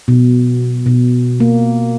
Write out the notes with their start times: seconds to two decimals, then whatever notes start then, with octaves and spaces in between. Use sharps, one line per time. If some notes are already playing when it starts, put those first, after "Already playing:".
0.08 B2
0.86 B2
1.40 A#3